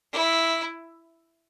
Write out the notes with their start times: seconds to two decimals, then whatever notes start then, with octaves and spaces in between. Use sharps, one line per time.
0.13 E4